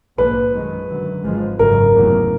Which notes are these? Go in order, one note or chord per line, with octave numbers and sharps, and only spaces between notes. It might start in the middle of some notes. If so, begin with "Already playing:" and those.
A#1 G#2 F3 A#3 B4
F#2 D#3 G#3
F#2 D3 F#3
G#1 G#2 F3 G#3
G#1 F#2 C#3 A#4
F1 E2 C#3 F#3 A#3